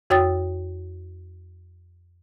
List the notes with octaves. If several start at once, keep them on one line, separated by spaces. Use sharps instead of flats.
F2 F#4 C#5 G5 D#6 A6